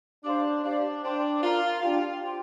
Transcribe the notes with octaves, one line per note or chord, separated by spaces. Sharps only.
D4 G4 C5 F5 C6
D4 G4 C5 F5
D4 C5 G5 C6
F4 A#4 D5 A#5
D4 F4 G4 D5 G5
G4 C5 G5 C6